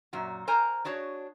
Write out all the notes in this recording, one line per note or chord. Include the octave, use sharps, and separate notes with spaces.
F#2 A#2 F#4
A#4 C5 G#5 A#5
D4 F#4 G#4 C#5